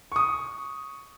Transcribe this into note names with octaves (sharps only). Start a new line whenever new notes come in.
C#6 D#6